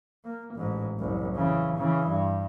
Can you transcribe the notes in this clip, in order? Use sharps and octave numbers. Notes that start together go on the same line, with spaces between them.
A#3
A1 G#2
F#1 C2
C#3 E3
C#3 E3
G2